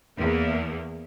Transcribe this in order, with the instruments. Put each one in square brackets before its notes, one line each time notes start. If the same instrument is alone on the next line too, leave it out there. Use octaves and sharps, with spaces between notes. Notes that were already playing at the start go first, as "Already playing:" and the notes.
[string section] E2 A#3